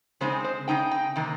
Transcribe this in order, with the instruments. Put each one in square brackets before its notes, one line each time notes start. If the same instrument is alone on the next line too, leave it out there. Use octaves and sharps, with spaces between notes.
[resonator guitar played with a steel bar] C#3 G#3 C4 D#4 C5
C5
C#3 G#3 C4 D#4 G5
G5
C3 D#3 A#3